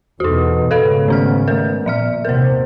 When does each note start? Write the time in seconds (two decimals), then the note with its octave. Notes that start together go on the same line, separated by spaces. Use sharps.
0.20 E2 B2 D#4 F#4
0.71 G#2 C#3 B3 A4 B4 F5
1.08 D#3 C#4 F6
1.48 D#3 A#4
1.86 A#2 F3 E5 F6
2.25 D#2 C3 C4 A#4 C5